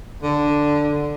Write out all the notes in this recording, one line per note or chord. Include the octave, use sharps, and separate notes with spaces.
D3